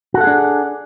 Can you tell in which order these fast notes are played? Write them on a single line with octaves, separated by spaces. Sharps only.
F#4 A4 F#5 G#4 D4